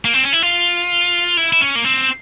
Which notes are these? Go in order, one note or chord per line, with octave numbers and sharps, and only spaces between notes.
A#3
C4
C#4
E4
F4
E4
E4
C#4
A#3
C4